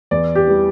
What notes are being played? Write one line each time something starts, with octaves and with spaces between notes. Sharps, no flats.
E2 D5
G4
E3 G3